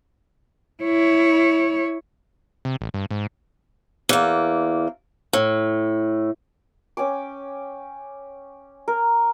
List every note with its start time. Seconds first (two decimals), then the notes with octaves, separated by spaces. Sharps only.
0.83 E4 C#5
2.65 C3
2.81 A1
2.94 G2
3.11 G#2
4.09 E2 A#3
5.33 A2
6.97 C#4 G5 G#5 D6
8.88 A#4